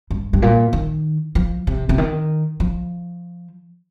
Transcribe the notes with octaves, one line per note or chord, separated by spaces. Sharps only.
G2
G2
A#2
D#3
F3
C3
C3
D#3
F3